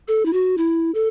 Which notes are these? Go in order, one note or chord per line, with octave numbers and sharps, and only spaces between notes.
A4
E4
F#4
E4
A4